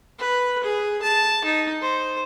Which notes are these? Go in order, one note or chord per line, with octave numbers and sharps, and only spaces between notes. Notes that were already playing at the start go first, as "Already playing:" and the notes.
B4
G#4
A5
D#4
C5